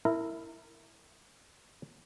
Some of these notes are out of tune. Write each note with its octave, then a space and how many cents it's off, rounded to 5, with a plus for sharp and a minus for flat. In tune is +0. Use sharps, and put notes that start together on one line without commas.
E4 +0 A#4 -20